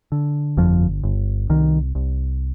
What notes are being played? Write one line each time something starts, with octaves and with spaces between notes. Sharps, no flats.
D3
G1 F2 F3
G1
C2 D#3
C2